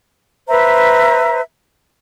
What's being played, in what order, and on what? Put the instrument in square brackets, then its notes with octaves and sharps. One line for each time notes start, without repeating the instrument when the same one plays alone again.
[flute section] B4 C5 E5 A#5